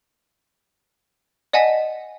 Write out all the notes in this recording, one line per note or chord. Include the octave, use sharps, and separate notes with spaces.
D5 D#5 F#5 G#5 A5 B6